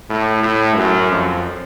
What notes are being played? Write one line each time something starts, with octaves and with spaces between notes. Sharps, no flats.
A2
A2
F#2
F2